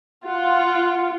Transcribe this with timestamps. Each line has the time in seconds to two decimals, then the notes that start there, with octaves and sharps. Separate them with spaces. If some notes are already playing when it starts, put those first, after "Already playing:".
0.24 F4 F#5